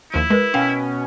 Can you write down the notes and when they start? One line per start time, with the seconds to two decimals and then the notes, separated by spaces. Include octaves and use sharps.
0.12 D#2 F3 E4 D7
0.30 G#3 A#4 B4
0.54 B2 C#4 F5 G5